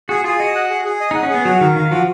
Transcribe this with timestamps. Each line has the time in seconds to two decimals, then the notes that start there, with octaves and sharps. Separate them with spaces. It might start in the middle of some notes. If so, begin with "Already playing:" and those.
0.09 F#4 G#4
0.24 F4 G#4
0.39 F#4 D#5
0.55 F#5
0.70 G#4
0.85 G#4
1.00 D#5
1.11 D#4
1.15 F#5
1.23 C#4
1.30 B3 G#4
1.45 F#3 F#4
1.61 D#3 A#4
1.76 D#3 F5
1.91 F3 F#4